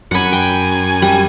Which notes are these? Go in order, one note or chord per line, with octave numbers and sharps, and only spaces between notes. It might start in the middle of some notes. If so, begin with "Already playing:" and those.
F#2 F#5 G#5 B5
G5
G3